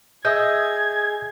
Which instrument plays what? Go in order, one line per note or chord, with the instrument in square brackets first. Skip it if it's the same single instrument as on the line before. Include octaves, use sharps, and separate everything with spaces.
[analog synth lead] G#4 [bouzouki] D#5 E5 [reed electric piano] D#6 G6 [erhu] G#6